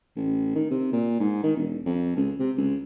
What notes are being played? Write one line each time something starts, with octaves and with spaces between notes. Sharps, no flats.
A1
D#3
C3
A#2
G#2
D#3
E1
F2
C#2
C3
C#2